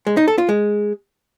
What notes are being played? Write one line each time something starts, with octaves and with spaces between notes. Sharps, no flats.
G#3
D#4
A4
F4
G#3